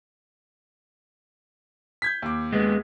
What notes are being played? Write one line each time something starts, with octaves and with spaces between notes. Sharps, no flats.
G6 G#6 B6
D#2 D6
G#3 B3